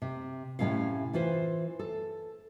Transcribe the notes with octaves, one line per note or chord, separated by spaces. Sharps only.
C3
A2 C3 A3 C#4 E4 F5
E3 F4 B4 C5
A4